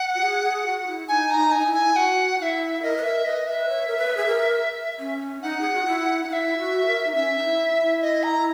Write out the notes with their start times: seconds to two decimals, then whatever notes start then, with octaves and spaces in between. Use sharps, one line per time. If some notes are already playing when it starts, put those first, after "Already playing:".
Already playing: F#5
0.15 F#4
0.22 G#4
0.44 G#4
0.66 F#4
0.87 E4
1.09 D#4 G#5
1.30 A#5
1.37 D#4
1.52 G#5
1.59 D#4
1.66 E4
1.74 G#5
1.95 F#4 F#5
2.39 E4 E5 F#5
2.82 A#4 D#5
2.97 B4
3.03 A#4 E5
3.25 B4 D#5
3.47 B4 E5
3.69 C#5
3.88 A#4
3.98 B4
4.17 G#4
4.26 A#4
4.99 C#4
5.42 D#4 F#5
5.61 G#4
5.74 F#4
5.86 E4
6.24 D#4
6.28 E4 F#5
6.33 E5
6.58 F#4
6.86 A#4
7.07 D#4
7.15 C#4 E5
7.38 D#4
7.44 E4
7.74 E4
8.02 D#5
8.23 A#5